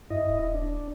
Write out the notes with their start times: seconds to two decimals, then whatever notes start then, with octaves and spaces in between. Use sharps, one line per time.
0.10 G2 E4 D#5
0.29 D#1
0.54 D4